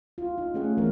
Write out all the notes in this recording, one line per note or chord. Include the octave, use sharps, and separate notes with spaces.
F4
D#4
A3 C#4 G#4 F#5
D#3 E3 B3 C4 A#4